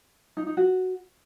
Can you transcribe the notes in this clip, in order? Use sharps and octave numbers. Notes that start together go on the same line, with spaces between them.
D#4
D#4
F#4